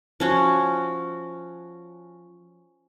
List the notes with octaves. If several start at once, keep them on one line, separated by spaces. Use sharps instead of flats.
F3 C#4 F#4